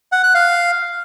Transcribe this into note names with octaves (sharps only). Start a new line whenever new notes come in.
F#5
F#6
F5